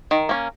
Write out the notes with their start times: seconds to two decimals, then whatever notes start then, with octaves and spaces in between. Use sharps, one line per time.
0.11 D#3
0.29 A#3 C#4